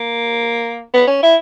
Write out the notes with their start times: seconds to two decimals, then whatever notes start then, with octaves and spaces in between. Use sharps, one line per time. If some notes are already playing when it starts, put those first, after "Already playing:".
Already playing: A#3
0.94 B3
1.08 C#4
1.23 E4